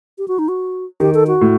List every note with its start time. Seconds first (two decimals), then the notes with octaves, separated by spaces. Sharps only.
0.18 G4
0.28 F#4
0.39 D#4
0.48 F#4
1.00 D#3 G4
1.14 A4
1.27 F#4
1.41 A2